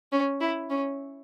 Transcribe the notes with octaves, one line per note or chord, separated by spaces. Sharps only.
C#4
E4
C#4